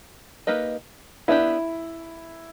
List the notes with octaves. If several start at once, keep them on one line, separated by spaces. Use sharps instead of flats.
A#3 D#4 G4 B4 D#5
B3 D4 E4 G4 E5